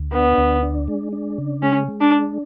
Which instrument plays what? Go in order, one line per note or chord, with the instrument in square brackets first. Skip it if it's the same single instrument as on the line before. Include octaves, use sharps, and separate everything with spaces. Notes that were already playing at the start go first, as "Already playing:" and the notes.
Already playing: [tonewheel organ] D2
[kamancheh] B3 [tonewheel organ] D4
[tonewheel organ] D2
D4
G#3
D4
C#3
[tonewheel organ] G#3 [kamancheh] C#4
[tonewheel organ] G#3
[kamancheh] D4
[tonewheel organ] D4